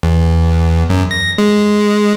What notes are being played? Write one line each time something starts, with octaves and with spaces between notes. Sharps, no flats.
E2
F#2
A#6
G#3